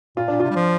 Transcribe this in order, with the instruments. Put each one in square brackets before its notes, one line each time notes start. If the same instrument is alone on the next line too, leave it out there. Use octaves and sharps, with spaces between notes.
[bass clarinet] A#2 [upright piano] F4
[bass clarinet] A#2 [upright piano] D4
[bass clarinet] C3 [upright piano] F4
[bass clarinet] G3
F3